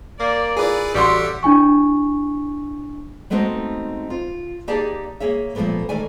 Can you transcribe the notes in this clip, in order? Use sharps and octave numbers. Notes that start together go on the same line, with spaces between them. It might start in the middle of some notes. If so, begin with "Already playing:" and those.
A#3 D5
E4 F4 G#4 B4 D5
A1 G3 F#4 A4 E5 F#5 C6 D6
D4 E4 G#5 C#6
G#3 A3 B3 C4 D#4 F#4
F4
A#3 D#4 G4 G#4 D5 A5
A#3 G#4 C#5 E5
A#2 F3 F#3 G#3 A3 B3
D#3 E3 A3 D5 G#5